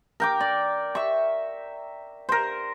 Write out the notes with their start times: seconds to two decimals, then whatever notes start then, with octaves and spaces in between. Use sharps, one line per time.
0.20 A#4 G5 D6
0.40 D5
0.95 E5 C#6
2.29 A#4 C5